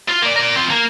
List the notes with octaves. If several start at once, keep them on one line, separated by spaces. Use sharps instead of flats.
F4
A#3 D5
A#4 D5
C4 F4
A#3